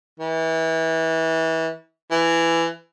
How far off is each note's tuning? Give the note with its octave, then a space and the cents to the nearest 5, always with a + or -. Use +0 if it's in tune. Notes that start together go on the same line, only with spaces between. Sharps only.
E3 -25
E3 +15